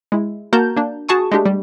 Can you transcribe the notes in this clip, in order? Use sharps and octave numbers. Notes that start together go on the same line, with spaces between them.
G#3 E4
A#3 F#4 A#4 A5 A#5 G6
A#3 D4
F#4 G#4 A5 C#6 D#6
G#3 A3 D4 G4
G3